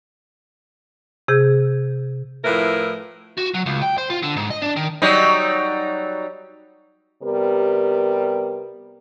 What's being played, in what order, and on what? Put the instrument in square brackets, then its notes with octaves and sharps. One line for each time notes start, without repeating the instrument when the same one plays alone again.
[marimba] C3 G#4 G6
[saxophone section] A2 F3 E4 A#4 B4
[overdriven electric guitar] F#4
F#3
C#2
G5
C5
F4
D3
G#2
D#5
D4
D#3
[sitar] F#3 G3 D#4
[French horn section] C3 G3 B3 G4 A#4